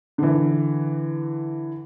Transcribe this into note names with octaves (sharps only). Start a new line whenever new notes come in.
D3 E3